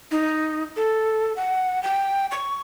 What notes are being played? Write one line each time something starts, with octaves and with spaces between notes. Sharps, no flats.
D#4
A4
F#5
G5
C#6